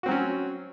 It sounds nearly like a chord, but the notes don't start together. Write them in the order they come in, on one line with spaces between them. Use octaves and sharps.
F#4 C4 F#3 C#4